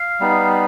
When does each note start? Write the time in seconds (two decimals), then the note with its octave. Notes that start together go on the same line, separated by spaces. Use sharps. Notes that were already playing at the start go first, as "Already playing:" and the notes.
Already playing: F5
0.20 G3 B3 D#4